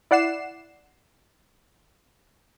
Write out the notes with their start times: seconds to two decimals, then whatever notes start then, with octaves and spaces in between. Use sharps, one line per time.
0.11 E4 D5 F#5 C7 E7